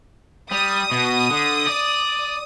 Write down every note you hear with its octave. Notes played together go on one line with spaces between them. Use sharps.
G3 D#6
B2
D3
D5